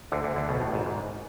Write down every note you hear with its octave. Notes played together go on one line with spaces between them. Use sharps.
D2 D3
D2 D3
D2 D3
B1 B2
A1 A2
G#1 G#2
G#1 G#2